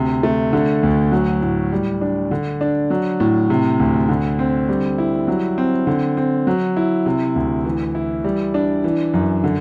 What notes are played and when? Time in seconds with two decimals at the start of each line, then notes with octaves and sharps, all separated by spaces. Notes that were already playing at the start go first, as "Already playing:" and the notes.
Already playing: D2 C3
0.23 A3
0.53 D3
0.83 D2
1.12 F#3
1.42 A2
1.72 G3
2.01 D4
2.31 D3
2.61 D4
2.90 F#3
3.20 A2
3.50 C3
3.80 D2
4.09 D3
4.39 C4
4.69 G3
4.98 E4
5.28 F#3
5.58 C4
5.87 D3
6.17 C4
6.47 F#3
6.77 E4
7.06 C3
7.36 D2
7.65 E3
7.95 E4
8.24 G3
8.54 D4
8.84 E3
9.14 F#2
9.44 D3